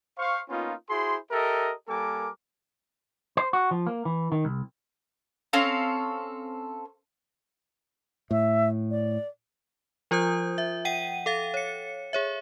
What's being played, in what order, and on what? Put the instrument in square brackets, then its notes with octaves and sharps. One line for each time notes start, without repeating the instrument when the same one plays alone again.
[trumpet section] C5 F5 C#6
A#3 B3 C#4 D#4 F4
E4 F#4 G#4 C5 C6
G4 A4 A#4 D#5 E5
G3 A#3 A4 A#4 G#5 D6
[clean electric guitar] C5
F#4
F3
A#3
E3
D#3
C2
[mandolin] C4 C#4 A4 F5
[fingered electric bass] A2 [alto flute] E5
[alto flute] D5
[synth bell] F3 F4 C5 D#6 G6
E5
F#5 G5 D#7
A4 F5 A6
C#5 C#7
G#4 C#5 E5